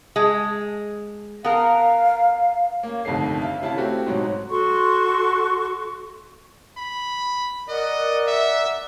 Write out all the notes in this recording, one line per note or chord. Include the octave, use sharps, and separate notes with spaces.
G#3
B3 A#4 F5
A#3 C#4
G1 C2 F2 D#3 A3 C7
E5 F5
C3 C#4 E4 F5 A5
A3 C4 F#4 G4
G#2 B2 F#3
F#4 A4 C6 C#6
B5
A#4 D5 D#5 F#5
E5